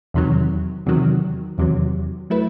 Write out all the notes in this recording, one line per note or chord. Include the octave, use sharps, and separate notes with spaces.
E2 C3 D#3 F#3
E2 C3 D#3 F#3
E2 C3 D#3 F#3
F#3 A3 E4 B4